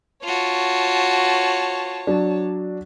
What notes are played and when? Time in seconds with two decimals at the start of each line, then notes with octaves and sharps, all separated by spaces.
0.24 F4 F#4 C#5 A5
2.07 F#3 D4